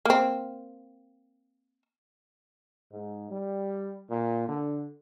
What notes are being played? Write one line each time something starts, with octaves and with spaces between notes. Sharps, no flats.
A#3 C4
G#2
G3
A#2
D3